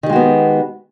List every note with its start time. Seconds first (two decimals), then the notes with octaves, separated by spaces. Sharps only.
0.03 D#3
0.06 G4
0.09 G#3
0.13 F#4
0.16 B3